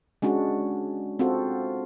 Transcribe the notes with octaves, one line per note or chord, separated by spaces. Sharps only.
G#3 C#4 D4 F#4
C4 F4 F#4 A4